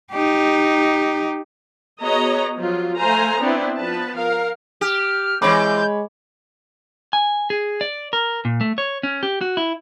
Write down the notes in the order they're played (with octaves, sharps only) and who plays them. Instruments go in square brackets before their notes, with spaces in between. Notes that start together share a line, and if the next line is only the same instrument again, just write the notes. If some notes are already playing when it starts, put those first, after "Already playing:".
[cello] D#4 G4
[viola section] B3 F#4 G#4 C#5 D#5 A#5
F3 F#3 F4
A3 C5 F5 G#5 A#5
B3 C4 D4 E4 B4
F3 B3 B4 A5
A#4 F5
[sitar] G4 [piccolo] F6
[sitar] E3 C4 [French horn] G#3 [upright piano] C#5 B5 D6 [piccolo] G6
[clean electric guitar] G#5
G#4
D5
A#4
A#2
A3
C#5
C#4
G4
F#4
E4